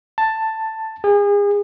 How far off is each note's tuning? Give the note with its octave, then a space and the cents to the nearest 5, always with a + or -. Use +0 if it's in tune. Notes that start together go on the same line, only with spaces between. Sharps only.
A5 +10
G#4 -35